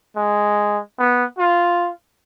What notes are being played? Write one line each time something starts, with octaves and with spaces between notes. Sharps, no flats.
G#3
B3
F4